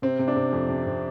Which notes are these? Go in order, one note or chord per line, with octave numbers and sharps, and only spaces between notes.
C3 C4
C3
D4
C3
F2
C3
C3